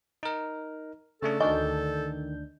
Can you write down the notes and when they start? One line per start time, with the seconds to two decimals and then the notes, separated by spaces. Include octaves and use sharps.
0.23 D#4 A#4
1.23 C#3 A3 D4 A4
1.40 D2 D#3 D4 D#5 G#5 C#6 G6